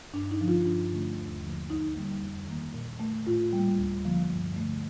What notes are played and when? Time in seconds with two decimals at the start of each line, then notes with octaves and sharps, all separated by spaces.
0.13 G2 D4
0.31 D#4
0.40 D3 F3
0.48 F4
0.66 G2 D4
0.92 D3 A3
1.18 D#2
1.43 D3 F3 A#3
1.70 D2 D#4
1.96 D3 G3 A#3
2.22 F2
2.48 D#3 A#3
2.74 A#2
3.00 A3
3.26 A2 F4
3.53 G3 A#3
3.78 D2
4.05 D3 F3 A#3
4.31 G2
4.56 D3 A3